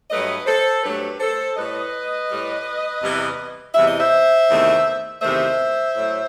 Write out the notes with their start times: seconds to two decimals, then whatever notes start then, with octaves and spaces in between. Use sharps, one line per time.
0.11 G2 F#3 A3 B4 D#5
0.46 A4 C5
0.83 G2 F#3 A3 G4 B4
1.20 A4 C5
1.56 A2 G3 B4 D#5
2.29 A2 G3
3.02 E2 C3 E3 G3
3.75 E2 C3 E3 G3 E5
3.88 D#5
4.00 C5 E5
4.49 E2 C3 D#3 A3
5.21 E2 C3 D#3 A3 C5 E5
5.95 A2 F#3 A3